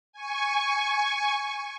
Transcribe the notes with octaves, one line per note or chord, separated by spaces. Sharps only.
G#5 C#6